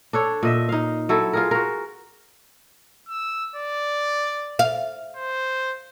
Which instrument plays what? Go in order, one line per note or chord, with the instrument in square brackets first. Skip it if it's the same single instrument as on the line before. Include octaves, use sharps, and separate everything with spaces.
[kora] D4 A4 C#5
A#2 D#5 E5
D#4 F5
F#3 E4 A4
F4 G#4 A#4
F#4 A#4
[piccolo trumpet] E6
D5
[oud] F5
[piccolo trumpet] C5